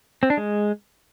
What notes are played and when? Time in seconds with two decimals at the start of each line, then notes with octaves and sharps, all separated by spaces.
0.23 C4
0.30 D4
0.37 G#3